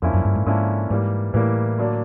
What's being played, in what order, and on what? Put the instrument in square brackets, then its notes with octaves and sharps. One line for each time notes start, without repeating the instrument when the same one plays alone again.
[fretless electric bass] F2 [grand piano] D3 F3 A#3 C#4 E4
[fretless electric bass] F#2
G2
G#2
[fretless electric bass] G#2 [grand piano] D3 F3 A#3 C#4 E4
[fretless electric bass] G#2 [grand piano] E3 G3 A#3
[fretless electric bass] A2 [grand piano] E3 G3 A#3
[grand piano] D3 F#3 A#3 D4